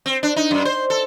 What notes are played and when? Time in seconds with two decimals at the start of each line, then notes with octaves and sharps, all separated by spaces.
0.06 C4
0.23 D4
0.36 D#4
0.51 F#2
0.65 C5
0.90 A4